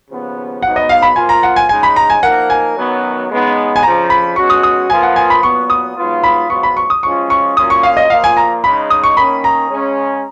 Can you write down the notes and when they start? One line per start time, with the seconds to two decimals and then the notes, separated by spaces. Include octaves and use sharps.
0.09 D#2 C#3 F3 B3
0.63 G#2 F#3 B3 D#4 F#5
0.76 D#5
0.89 F5
1.02 B5
1.16 F3 A#3 F4 G#5
1.29 A#5
1.43 F#5
1.56 G#5
1.69 C#3 G#3 D#4 G#5
1.83 B5
1.96 A#5
2.10 G#5
2.23 F3 A#3 D#4 A#4 F#5
2.50 G#5
2.76 F#2 D#3 F#3 B3
3.29 C#3 G#3 B3 D#4
3.76 G#5
3.83 F2 C#3 F3 A#5
4.10 B5
4.36 B2 G#3 C#4 F#4 C#6
4.50 D#6
4.63 D#6
4.89 F3 A#3 F4 B4 G#5
5.03 F#5
5.16 G#5
5.30 B5
5.43 A#2 F#3 B3 C#6
5.70 D#6
5.97 G#2 F#3 B3 F4
6.24 B5
6.50 G#2 F#3 B3 F4 C#6
6.63 B5
6.77 C#6
6.90 D#6
7.03 F#2 F3 G#3 C#4 F4 C#6
7.30 C#6
7.57 A#2 F#3 A#3 C#4 F4 D#6
7.70 C#6
7.83 F5
7.97 D#5
8.10 A#2 F3 A#3 F4 F5
8.24 G#5
8.37 A#5
8.63 C#3 G#3 D#4 B5
8.90 D#6
9.04 C#6
9.17 D#3 A#3 C#4 B5
9.44 A#5
9.70 C#3 G#3 C#4